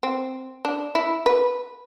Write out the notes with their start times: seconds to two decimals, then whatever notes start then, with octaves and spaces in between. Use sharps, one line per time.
0.03 C4
0.65 D4
0.95 E4
1.26 B4